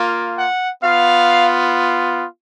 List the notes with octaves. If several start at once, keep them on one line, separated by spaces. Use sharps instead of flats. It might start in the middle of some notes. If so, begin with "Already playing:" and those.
Already playing: A#3 F4
F#5
B3 F4 F5